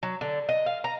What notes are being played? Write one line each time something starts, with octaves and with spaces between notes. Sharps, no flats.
F#3
D3
D#5
F5
A#5